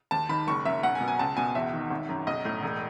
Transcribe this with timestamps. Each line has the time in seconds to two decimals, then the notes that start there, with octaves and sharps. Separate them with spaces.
0.11 D#2 A5
0.29 D#3 B5
0.47 F#1 C#6
0.65 F#2 E5
0.83 B1 F#5
0.95 G#5
1.01 B2
1.08 G#5
1.19 C#2 A5
1.37 B2 G#5
1.55 E2 E5
1.73 D#3
1.90 G#1
2.09 F#2
2.27 B1 D#5
2.45 A2
2.63 E1